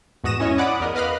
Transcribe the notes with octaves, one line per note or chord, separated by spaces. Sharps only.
E2 G#2 F#4 D#6 A#6 E7
C#4 E4 C#5 D#5
D5 F#5 B5 D6 D#6
E2 A#4 D#5
B4 D#5 F5 B5 F6 F#6